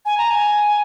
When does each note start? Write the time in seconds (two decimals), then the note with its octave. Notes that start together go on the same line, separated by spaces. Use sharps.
0.05 G#5
0.18 A#5
0.30 G#5